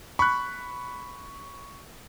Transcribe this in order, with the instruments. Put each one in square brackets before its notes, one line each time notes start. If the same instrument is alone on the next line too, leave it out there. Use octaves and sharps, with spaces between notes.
[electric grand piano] B5 F#6 [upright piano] C#6